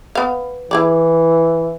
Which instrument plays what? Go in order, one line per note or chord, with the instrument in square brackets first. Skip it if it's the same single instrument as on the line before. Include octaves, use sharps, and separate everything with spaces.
[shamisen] B3 F5
[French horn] E3 [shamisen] E4 G#4 D5